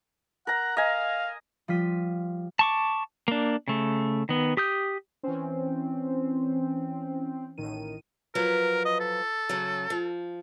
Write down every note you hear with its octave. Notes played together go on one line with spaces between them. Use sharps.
A#4 F#5 A#5
D#5 F5 G#5
F3 G3 F4 B6 D#7
A5 C#6 D6
A#3 D4
C#3 A3
D#3 B3
G4 D#6 G6
E3 C4 C#4
A1 A2 D#3 D#7
F3 F#3 A#4 B4
D#5
A4
C#3 F#3
F3